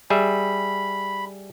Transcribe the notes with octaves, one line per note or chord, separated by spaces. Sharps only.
G3 G#4 E5 B5